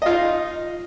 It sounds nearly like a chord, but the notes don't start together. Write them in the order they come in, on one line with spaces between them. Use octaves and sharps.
D#5 F4 D#4